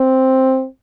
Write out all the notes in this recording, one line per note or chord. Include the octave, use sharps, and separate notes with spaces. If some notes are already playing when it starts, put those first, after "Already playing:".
Already playing: C4